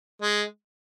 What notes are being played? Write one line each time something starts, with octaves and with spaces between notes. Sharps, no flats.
G#3